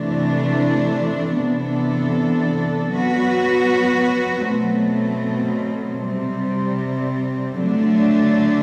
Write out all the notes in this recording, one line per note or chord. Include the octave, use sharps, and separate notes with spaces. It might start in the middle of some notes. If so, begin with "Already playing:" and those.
Already playing: C3 E3 A3 D4
C3 E3 B3 D4 A4
F#3 B3 F#4 B4
B2 F#3 A3 C4
C3 G3 C4
D3 F#3 A3 D4